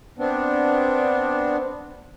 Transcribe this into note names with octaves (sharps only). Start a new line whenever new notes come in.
B3 C4 D4